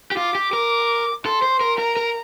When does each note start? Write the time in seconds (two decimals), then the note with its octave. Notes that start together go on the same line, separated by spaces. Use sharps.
0.11 G4
0.17 F4 D6
0.35 G4
0.53 A#4
1.25 A4 C6
1.42 C5
1.61 A#4
1.78 A#4 A#5
1.97 A#4